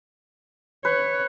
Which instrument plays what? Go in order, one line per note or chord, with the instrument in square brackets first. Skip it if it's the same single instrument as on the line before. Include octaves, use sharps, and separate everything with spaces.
[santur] B4 [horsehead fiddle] C#5